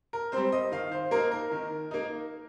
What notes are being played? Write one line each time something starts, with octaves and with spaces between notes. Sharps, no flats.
A#4
G3 C4 C5
D#5
D#3 F5
C5
A#3 D#4 A#4
A#4
D#3
A#3 D#4